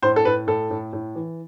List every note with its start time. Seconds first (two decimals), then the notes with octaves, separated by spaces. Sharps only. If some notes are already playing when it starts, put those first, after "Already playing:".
0.02 A2 C5
0.16 A4
0.25 A2 B4
0.47 A2 A4
0.71 A2
0.93 A2
1.15 E3